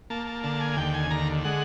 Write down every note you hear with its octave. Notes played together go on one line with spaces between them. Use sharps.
A#3 A5
A5
D3 A5
G#5
D#2 G5
G#5
D3 A#5
G#3 F#5